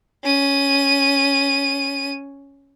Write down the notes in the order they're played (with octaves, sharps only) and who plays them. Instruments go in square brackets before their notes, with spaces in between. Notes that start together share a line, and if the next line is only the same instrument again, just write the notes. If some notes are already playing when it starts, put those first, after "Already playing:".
[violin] C#4 D#7